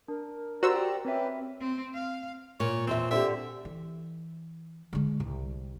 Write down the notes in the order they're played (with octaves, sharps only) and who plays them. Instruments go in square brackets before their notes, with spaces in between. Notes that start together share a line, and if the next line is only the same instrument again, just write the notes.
[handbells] D4 [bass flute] A#4
[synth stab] F#4 C5 E6 [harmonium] G4 D5 A#5
[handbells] C4 C#5 E5 [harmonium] C#4 G4 B4
[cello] C4
F5
[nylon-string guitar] A#2 [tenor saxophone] C#5
[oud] E2 C5 E5 [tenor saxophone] C4
[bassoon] D3 [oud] C4 G4 [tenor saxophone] E5
[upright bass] E3
D3 G#3
C2